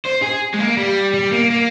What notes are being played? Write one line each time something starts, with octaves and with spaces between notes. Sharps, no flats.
C5
G#4
G#3
A#3
G3
G3
A#3
A#3